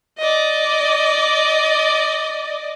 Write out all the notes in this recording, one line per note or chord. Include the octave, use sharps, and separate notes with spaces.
D5 D#5